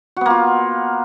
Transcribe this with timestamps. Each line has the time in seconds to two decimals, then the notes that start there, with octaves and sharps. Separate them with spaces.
0.17 F#4
0.21 B3
0.26 A#3
0.30 F4